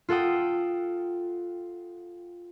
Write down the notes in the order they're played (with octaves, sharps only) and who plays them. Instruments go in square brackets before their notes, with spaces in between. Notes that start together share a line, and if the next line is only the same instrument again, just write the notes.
[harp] F4 A4 F#5 G5 D#6